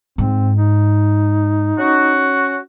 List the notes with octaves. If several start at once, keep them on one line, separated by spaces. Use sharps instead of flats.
G#2 C4
D#4
C#4 F#4